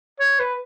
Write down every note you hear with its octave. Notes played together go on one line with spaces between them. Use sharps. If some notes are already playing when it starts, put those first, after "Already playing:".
C#5
B4